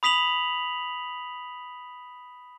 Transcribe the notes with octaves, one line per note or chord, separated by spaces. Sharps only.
B5 D#6 B6 F7 F#7